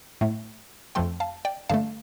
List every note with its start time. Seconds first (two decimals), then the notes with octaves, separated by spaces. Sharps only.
0.21 A2 A3
0.95 F2 F3 A3 G5 C6
1.20 F5 A5
1.45 D5 G5
1.69 G2 D3 A3 F5 A5